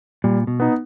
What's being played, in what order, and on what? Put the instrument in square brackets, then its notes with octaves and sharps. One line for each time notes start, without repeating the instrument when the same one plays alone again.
[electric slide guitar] A#2 [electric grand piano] G3
[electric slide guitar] B2
[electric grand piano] B3 D#4